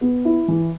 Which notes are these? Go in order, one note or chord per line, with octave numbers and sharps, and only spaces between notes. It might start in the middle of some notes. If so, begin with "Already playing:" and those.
B3
E4
E3